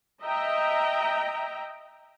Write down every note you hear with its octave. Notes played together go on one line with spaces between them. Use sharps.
D#5 E5 G5 A#5